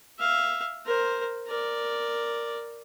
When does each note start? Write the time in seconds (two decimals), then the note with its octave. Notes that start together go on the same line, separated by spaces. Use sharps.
0.18 E5 F5
0.85 A#4 C5
1.47 A#4 D5